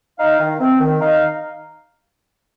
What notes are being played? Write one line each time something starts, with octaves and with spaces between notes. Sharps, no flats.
D#4 F5
D#3
C4
D#3
D#4 F5